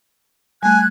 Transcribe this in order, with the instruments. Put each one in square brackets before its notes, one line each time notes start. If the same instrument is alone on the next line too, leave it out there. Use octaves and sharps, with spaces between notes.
[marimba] G3 A3 [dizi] G#5 [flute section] F#6 G#6